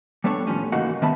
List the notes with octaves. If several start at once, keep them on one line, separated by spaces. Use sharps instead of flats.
G3 B3 D4 A4 C#5
D#2 A2 F3 G3 C#4
G#2 C#3 E3 A#3 D#4 F#4
D#3 G3 B3 E5 A5 B5